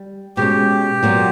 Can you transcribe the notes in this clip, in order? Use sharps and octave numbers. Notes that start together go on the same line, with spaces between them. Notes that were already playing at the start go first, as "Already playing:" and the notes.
Already playing: G3
B2 G#3 C#4 G4
A#2 F#3 B3